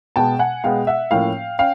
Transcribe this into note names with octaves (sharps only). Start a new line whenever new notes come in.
B2 G#3 B3 G5 A5
F#5 G#5
B2 G#3 B3 F5 G5
E5 F#5
A2 F3 A#3 C#4 F5 G5
C#4 F5 G5